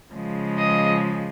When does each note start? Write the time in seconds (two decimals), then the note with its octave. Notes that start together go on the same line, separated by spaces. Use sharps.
0.14 C#3 F3 G#3
0.58 D#5